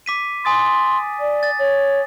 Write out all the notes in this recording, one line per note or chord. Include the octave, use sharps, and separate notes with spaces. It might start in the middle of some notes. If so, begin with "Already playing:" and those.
D6 B6 D#7
G#5 C6 D#6 A6
D5
A6
C#5